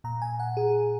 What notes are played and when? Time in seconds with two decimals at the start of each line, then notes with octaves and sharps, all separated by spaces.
0.04 A#2 A#5
0.22 G#5
0.39 F#5
0.57 G#4